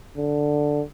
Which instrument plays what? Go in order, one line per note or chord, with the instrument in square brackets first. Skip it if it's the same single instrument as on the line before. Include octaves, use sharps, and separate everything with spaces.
[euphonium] D3